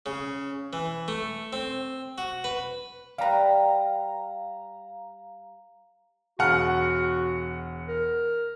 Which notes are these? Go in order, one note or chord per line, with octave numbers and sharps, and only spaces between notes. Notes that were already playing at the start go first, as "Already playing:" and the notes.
C#3
E3
A3
C4
F#4
B4
G3 B4 F5 A#5
E1 F#4 F#5 F6
A#4